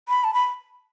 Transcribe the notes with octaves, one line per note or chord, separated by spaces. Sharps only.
B5
A5
B5